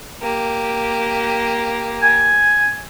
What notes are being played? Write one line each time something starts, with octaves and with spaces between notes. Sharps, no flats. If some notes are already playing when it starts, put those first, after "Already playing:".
A#3 G4
G#5